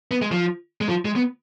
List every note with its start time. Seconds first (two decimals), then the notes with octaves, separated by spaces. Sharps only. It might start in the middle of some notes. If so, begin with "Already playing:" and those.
0.11 B3
0.22 G#3
0.32 F3
0.81 G#3
0.89 F3
1.05 G#3
1.16 B3